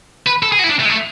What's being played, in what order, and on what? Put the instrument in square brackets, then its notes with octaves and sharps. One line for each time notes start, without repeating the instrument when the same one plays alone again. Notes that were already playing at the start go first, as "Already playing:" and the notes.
[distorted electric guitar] B4
A4
G#4
F#4
E4
D4
A3
G#3
A3